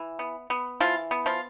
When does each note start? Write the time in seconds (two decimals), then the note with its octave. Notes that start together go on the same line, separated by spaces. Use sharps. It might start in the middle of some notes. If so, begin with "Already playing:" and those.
Already playing: E3
0.19 B3
0.50 B3
0.80 E3 F3 F4
1.11 B3
1.26 F3 F4